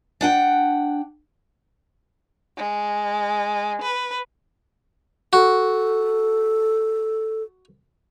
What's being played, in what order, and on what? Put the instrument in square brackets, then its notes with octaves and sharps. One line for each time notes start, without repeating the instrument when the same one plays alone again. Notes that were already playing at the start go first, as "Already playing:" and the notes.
[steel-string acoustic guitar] D4 F#5 G5
[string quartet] G#3
B4
[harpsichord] F#4 [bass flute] A4